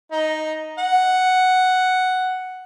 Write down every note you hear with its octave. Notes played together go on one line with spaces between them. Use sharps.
D#4
F#5